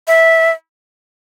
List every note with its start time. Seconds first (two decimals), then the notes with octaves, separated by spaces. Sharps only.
0.08 E5